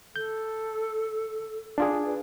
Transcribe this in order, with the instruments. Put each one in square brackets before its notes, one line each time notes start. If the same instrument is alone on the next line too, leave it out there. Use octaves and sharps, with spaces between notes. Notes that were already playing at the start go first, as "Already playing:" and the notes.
[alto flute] A4 [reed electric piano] G6
[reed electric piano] D4 F4 G#4
[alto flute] B4